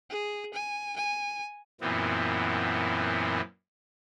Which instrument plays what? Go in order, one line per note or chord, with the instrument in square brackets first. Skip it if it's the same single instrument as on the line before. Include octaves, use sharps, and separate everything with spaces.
[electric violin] G#4
G#5
G#5
[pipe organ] F#2 A#2 E3 B3 C4